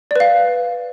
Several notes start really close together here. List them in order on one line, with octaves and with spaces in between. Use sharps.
D5 B4 F5